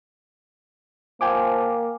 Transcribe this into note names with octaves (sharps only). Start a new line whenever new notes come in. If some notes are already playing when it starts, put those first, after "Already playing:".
F3 A#3 G5 G#5 D6